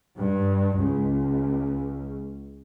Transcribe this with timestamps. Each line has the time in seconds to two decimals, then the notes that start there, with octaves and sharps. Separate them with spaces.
0.16 G2
0.77 C#2